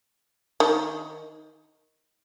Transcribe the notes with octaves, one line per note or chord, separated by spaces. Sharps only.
D#3